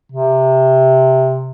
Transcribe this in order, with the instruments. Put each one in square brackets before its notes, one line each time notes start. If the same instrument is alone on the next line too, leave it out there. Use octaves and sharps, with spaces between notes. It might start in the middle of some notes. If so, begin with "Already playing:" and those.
[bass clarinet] C3